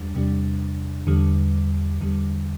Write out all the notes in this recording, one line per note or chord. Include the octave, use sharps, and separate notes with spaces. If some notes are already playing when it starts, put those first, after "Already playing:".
Already playing: E2 G3 D4
E2 C3 G3 D4
E2 D3 G3
E2 D3 G3